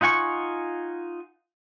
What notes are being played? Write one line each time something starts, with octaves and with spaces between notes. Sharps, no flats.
D#4 F4 F#5 G#5 C#6